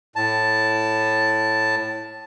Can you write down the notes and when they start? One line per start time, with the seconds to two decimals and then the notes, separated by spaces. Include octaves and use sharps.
0.16 A2 A5